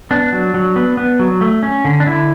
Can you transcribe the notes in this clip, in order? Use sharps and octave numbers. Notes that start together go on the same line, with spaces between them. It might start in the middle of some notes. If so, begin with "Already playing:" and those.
B3 D4
F#3
F#3
B3
B3
F#3
A3
C#4
D3
D4
D3 E4